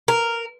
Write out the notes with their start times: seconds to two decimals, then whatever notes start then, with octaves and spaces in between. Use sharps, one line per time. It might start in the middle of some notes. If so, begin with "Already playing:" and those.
0.08 A#4